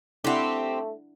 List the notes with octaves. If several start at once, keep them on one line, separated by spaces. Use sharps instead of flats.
A3 C4 D4 E4 G4 F#5